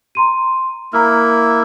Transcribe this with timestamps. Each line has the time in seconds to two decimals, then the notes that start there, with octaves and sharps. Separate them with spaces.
0.15 A#5 C6 D#7
0.93 A#3 E4 A#5 F6